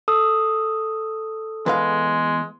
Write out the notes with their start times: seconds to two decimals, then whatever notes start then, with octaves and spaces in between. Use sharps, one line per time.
0.08 A4 D#6 E6
1.66 E2 G#3 B4 F5